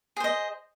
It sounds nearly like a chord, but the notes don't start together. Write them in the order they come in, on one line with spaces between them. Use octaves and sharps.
G#4 C5 D#5